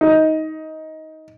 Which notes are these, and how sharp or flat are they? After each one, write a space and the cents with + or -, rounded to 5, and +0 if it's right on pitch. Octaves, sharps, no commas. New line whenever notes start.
D#4 +15